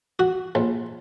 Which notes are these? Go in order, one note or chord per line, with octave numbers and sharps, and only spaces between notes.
F#4
A#1